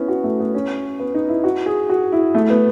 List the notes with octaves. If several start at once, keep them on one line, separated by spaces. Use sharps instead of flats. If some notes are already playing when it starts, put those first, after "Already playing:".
Already playing: B3 C#4 E4
F#4
A3
B3
C#4
B3
D#4
E4
F#4
G#4
F#4
E4
A3
B3